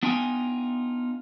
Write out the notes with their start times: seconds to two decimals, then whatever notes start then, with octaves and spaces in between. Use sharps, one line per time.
0.03 B3 D4 D#4 F4 G5 G#5